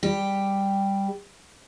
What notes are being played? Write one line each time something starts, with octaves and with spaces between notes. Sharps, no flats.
G3 G4